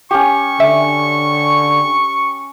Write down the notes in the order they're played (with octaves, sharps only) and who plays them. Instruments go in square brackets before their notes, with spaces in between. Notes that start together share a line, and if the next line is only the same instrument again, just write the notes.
[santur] C#4 G4 [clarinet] C#6
[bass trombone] D3 [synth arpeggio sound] E5